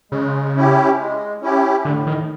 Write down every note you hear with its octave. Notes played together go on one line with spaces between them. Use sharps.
C#3 G#3
C#4 E4 G4
G#3
C#4 E4 G4
A2 D3
D#3